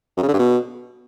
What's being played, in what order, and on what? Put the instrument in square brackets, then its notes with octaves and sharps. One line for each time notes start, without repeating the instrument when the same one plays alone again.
[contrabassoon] F#2
C#3
D3
G2
B2